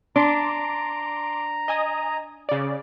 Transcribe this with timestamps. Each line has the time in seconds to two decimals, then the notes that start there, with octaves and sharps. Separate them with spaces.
0.16 D4 A#5 C6 D6 D7
1.68 D#5 G#5 D#6
2.49 C#3 D5